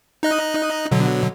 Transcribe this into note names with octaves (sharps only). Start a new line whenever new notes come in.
D#4 D#5 F#6
B2 D3 F#3